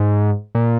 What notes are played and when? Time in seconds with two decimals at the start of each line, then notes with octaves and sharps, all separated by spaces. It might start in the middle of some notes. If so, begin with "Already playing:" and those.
Already playing: G#2
0.55 A#2